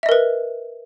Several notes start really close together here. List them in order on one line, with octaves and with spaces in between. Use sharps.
E5 D#5 A#4 B4